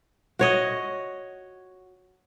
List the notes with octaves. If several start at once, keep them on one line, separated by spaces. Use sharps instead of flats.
F#4 C#5 D#5